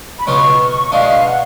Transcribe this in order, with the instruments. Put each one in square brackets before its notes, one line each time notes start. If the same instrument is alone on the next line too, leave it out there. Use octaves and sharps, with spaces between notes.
[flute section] B5
[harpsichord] C#2 B2 F#3 B3 F4 [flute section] C#6
[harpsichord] B2 G#3 D4 [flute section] F5
[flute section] F#5